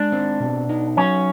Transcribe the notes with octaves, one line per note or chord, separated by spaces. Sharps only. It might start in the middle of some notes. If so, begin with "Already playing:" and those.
Already playing: G#3 D4
C4
B2
D#4
F#3 C#4